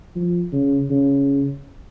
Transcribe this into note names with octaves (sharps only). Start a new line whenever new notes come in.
F3
C#3
C#3